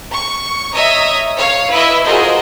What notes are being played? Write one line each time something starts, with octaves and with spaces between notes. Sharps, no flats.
C#6
C#5 D#5 E5 A#5 D#6
C#5 F5
E4 B4 D#5 E5
F4 F#4 G#4 A#4 C5 D#5